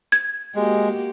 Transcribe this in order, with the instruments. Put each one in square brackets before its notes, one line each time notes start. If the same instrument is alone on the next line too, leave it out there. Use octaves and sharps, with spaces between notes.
[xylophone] G#6
[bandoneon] G#3 [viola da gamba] A#3 F#4 G4